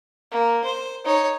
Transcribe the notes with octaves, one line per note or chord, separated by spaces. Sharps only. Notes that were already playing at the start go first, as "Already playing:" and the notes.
A#3
C5
D#4 C#5